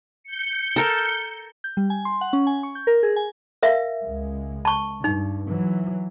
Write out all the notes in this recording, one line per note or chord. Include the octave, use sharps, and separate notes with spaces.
G6 C#7
A4 A#4 A5
G6
G3
G#5
C6
F#5
C#4
G#5
C#6
G6
A#4
G#4
G#5
A#4 E5 F5
C#2 G#3
A5 C#6
G2 D#4
E3 F#3